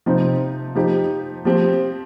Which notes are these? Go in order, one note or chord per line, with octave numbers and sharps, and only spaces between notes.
C3 F3 C4 D#4
F3 D#4 G4
F3 C4 G4